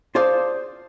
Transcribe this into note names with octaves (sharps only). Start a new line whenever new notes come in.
F4 G#4 C5 D5 F5 A5